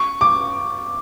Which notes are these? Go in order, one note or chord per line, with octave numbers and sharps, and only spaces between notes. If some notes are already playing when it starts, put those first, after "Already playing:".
Already playing: C#6
D6